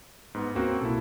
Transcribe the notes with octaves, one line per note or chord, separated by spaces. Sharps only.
G#2 B3
D2 A#3 C4 C#4 F#4
B1 B2 A#3 E4 A4